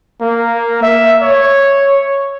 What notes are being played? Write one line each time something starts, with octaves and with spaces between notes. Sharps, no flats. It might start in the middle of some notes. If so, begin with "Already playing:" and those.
A#3
E5
C#5